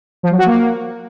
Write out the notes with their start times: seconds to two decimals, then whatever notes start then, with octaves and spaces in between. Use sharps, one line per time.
0.23 F3
0.31 F#3
0.38 F#4
0.46 A#3